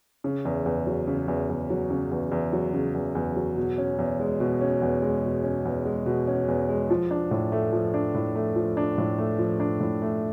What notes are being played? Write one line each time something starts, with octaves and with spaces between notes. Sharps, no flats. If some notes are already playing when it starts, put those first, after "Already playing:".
C#3
E2
E2
F#3
C#3
E2
E2
F#3
C#3
E2
E2
F#3
C#3
E2
E2
F#3
B2
C#4
E2
G#3
B2
C#4
E2
G#3
B2
C#4
E2
G#3
B2
C#4
E2
G#3
F3
D4
A2
A3
F3
D4
A2
A3
F3
D4
A2
A3
F3
D4
A2
A3